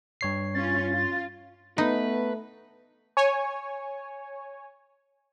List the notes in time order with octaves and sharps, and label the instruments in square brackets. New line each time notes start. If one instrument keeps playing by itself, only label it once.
[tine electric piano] G2 C#5 C7
[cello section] C#4 F4 [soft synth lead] A6
[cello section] F4
[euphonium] A3 [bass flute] B3 [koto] D#4 [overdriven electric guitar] B4
[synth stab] C#5 G#5